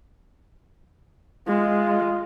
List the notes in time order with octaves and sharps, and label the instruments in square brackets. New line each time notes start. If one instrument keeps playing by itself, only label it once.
[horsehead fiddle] G#3 [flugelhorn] F4